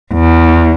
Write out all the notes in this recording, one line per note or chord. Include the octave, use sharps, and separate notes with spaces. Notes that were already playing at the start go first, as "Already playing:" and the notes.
E2